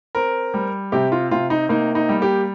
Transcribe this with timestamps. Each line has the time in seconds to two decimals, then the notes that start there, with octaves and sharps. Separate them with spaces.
0.15 C4 A#4
0.54 G3
0.92 C3 G4
1.12 F4
1.31 C3 F4
1.50 D#4
1.69 A#3 D#4
1.95 D#4
2.09 G3
2.22 G4